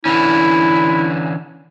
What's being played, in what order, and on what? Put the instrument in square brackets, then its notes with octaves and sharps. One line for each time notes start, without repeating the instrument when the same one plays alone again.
[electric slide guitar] D3 E3 C#4 [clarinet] E4